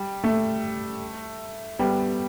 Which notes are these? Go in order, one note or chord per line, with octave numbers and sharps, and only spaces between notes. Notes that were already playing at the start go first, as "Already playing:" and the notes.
Already playing: G3
A3
G3 B3